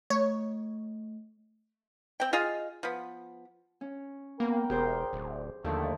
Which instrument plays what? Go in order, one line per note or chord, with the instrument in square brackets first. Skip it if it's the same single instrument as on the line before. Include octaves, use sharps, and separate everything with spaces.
[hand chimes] A3 [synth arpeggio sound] C#5
[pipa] C4 G5
F4 G#4 D#5 F5
F3 B3
[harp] C#4
[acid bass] A#3 [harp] B3 [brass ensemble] A#4 G5
[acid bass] E1 [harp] G4 G#4 C5
[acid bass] D1
[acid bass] D#2 [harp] D3 D#3 F3 [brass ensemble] A3